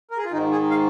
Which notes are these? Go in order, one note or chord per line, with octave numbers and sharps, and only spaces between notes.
A#4
G#4
F4
G#2 D#3 D#4
G#4
F5